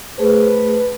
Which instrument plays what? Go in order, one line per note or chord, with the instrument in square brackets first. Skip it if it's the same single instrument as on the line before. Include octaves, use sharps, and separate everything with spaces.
[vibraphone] A3 G#4 C5 [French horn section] B4